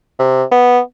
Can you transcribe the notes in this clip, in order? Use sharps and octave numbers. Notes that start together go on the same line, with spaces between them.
C3
B3